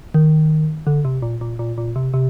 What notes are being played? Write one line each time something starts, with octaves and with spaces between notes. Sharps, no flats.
D#3
D3
C3
A#2
A#2
A#2
A#2
C3
C3